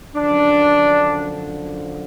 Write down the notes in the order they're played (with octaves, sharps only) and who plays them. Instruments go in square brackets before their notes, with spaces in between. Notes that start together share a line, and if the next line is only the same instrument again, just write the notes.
[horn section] F#2 D3 F3 D4